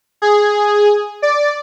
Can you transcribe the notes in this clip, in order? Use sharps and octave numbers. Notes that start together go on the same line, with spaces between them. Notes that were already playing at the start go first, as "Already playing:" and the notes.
G#4
D5